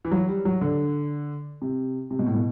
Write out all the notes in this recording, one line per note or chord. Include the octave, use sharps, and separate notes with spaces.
E3
F#3
G3
F#3
D3
C3
C3
B2
A2
B2